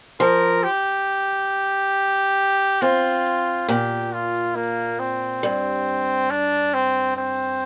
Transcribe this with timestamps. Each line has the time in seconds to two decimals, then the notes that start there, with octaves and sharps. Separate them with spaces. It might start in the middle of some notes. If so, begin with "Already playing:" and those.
0.20 F3 A#4
0.64 G4
2.82 C4 F4
3.69 A#2 G4
4.13 F4
4.56 A#3
4.99 C4
5.43 G2
6.31 D4
6.74 C4
7.17 C4